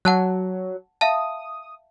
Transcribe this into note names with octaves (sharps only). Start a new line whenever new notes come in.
F#3 F#5 A5 F#6
E5 F5 A5 D#6